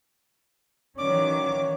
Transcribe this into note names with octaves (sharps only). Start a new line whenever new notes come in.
D#3 E3 F#3 A#3 C#4 C#5 D5 D6